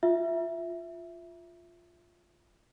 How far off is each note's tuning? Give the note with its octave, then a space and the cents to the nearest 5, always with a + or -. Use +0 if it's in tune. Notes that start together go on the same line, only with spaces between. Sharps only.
F4 +0 E5 +5